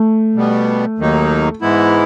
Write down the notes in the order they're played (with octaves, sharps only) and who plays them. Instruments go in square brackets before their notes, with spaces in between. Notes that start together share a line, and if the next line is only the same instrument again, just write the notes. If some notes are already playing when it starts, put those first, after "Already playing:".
Already playing: [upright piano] A3
[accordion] B2 G3 B3
D#2 D#3 F#3 A#3 D#4
G#2 E3 G#3 B3 E4